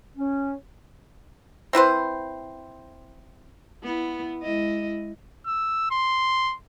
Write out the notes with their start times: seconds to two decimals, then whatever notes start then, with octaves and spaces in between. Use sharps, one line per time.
0.17 C#4
1.73 C4 E4 B4 C5
3.83 B3 E4
4.42 G#3 E4 D#5
5.47 E6
5.91 C6